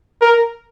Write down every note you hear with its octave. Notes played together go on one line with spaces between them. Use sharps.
A#4